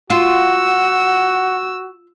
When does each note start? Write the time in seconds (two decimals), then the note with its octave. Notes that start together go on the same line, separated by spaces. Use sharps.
0.10 F4 F#4 F#5 E6